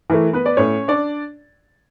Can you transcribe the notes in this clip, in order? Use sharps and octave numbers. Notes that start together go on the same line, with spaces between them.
E3 A3 A#4
B3 B4
D5
A2 C#4 C#5
D4 D5